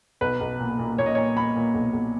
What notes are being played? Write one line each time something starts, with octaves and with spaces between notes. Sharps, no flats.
B1 B4
B1
A#2
A#2
A#2 C#5
D#5
A#2 C#5
A#2 B5
A#2
B1
B1